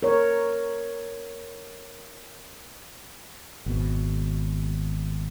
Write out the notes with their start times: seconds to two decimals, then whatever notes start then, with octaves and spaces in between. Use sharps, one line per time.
0.03 A#4 C#5
3.66 G#1 B2